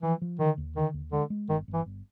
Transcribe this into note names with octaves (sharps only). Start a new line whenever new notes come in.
E3 F3
F3
D3 D#3
D#2
D3 D#3
D#2
D3 G#3
G#3
G1 D#3
G1
E3
G1